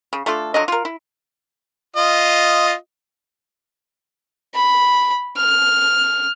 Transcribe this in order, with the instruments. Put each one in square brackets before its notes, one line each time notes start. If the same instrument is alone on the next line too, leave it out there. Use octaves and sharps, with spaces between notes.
[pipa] C#3
A3 D4 F4 A4
D3 F3 F#3 D#5
F4 A#4
E4
[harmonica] F4 D#5
[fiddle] B5
F6